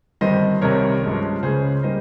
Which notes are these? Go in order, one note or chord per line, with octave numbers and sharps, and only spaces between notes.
G1 G2 D#3 G3 C4 C5 D#5
C2 C3 D#3 G3 A#4 C#5
G2 F3 G#3 C#4
C#2 C#3 G#3 C#4 G#4 C5
G3 A#3 D#4 C5 D#5